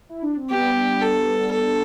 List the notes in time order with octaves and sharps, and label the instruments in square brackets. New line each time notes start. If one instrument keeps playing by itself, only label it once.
[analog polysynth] E4
D4
C4
[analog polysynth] G3 B3 [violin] G4
[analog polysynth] B3 D4
[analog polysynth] B3 D4 [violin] A4
[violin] A4